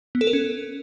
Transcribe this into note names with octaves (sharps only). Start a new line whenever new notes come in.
B3
A4
A#4
C#4